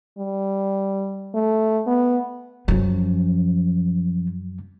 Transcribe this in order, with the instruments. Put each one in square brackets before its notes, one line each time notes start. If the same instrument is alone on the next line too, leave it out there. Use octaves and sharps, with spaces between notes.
[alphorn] G3
A3
B3
[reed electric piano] F#2 F#3 [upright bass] F3 C#4